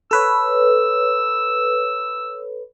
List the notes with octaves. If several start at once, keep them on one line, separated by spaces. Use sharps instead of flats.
A4 B4 C#5 E6